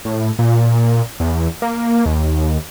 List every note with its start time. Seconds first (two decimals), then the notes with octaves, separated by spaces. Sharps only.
0.05 A2
0.39 A#2
1.20 E2
1.62 A#3
2.06 D#2